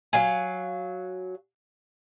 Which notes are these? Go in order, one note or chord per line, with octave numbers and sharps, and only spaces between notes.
F#3 F5 G#5